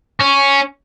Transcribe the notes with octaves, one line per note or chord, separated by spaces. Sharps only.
C#4